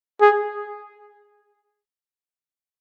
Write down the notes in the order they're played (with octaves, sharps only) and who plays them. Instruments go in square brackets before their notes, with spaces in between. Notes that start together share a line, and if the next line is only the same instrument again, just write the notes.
[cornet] G#4